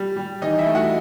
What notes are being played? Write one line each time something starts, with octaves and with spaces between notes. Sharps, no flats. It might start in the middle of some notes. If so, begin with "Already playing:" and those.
Already playing: G3
G3
E3 D#4 D#5
E4 E5
A3
F#4 F#5